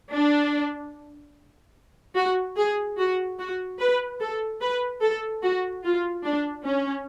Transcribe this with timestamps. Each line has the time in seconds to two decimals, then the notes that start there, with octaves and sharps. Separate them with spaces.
0.13 D4
2.16 F#4
2.57 G#4
2.98 F#4
3.39 F#4
3.79 B4
4.20 A4
4.61 B4
5.02 A4
5.42 F#4
5.84 F4
6.24 D4
6.65 C#4